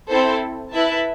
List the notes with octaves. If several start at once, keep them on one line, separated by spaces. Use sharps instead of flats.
C4 E4 A4 C5
E4 B4 E5 A5